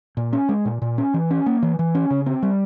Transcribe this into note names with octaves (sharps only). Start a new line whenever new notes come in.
A#2
C#4
G#3
A#2
A#2
C#4
E3
C#4
A#3
E3
E3
C#4
C#3
C4
G3